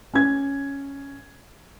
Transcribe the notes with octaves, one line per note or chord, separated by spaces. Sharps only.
C#4 G#6